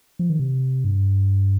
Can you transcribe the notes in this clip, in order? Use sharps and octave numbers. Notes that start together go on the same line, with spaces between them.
F3
D#3
C3
G2